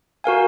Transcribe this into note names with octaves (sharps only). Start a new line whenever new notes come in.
F#4 A#4 F5 G#5